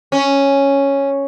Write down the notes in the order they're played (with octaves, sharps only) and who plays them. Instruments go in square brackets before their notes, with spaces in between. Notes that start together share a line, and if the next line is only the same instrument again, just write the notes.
[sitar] C#4